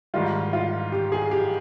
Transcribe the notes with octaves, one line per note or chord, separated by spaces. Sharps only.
G#2 D#3 G3 F4
F4
G4
G#4
G4